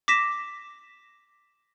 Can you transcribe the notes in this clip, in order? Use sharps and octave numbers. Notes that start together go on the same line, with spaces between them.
D6 A#6 B6 E7